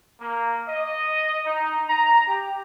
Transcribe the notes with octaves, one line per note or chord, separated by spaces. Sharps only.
A#3
D#5
D#4
A#5
G4